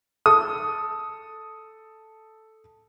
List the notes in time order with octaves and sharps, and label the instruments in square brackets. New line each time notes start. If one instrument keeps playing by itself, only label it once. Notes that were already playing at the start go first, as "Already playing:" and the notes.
[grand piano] A4 D#6